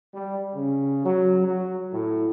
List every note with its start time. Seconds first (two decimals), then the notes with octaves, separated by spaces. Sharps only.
0.13 G3
0.55 C#3
1.04 F#3
1.46 F#3
1.91 A2